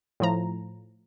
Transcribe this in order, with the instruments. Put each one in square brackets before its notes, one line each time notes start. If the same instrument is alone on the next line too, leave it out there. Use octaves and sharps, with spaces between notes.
[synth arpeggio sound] A2 F3 A#5